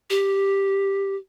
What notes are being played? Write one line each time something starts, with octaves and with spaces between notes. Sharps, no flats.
G4